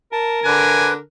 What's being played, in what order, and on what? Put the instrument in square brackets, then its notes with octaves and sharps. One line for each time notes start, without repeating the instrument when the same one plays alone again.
[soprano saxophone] A#4 [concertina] A5
[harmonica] D3 [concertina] B4 [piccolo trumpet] G#5